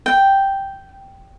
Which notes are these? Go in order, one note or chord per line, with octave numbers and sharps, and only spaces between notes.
G5